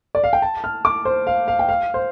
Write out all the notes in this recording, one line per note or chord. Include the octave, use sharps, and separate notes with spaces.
D5
F5
G5
A5
F6
D6
C5
F5
F5
G5
F5
C5